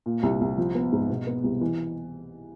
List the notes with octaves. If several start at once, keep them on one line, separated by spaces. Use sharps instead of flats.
A#2
C2
C2
F3
B3
G#2
B2
B3
C2
E3